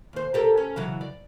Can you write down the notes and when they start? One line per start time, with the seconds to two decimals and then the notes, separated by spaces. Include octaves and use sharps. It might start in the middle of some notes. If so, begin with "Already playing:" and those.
0.13 D#2 C5
0.34 G4 A4 A#4
0.57 C#4
0.76 C#3 E3 F#3
1.01 D5